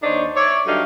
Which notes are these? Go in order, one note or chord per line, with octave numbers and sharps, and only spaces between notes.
D#2 D4 D#4 C5 C#5
C#5 D5 E5
G2 D3 F#3 D#4 E5 F5